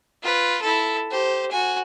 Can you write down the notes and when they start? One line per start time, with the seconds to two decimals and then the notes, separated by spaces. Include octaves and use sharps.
0.22 F4 B4
0.62 E4 A4
1.11 G4 C5
1.51 F#4 G#5